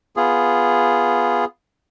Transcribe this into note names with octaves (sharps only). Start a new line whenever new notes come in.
B3 F4 G#4